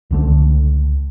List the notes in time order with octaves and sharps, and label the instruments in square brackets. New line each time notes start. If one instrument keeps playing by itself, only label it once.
[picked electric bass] C#2 D3 A3